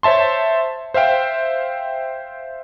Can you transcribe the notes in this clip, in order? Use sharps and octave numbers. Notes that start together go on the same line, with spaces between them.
C5 C#5 E5 A5 C6
C5 E5 F5 G5